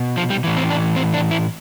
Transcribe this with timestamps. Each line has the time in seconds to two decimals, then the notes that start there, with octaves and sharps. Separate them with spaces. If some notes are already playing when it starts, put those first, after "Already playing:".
Already playing: B2
0.17 F3
0.30 G3
0.44 A2 E3
0.57 C4
0.70 D4
0.96 C4
1.14 D4
1.31 E4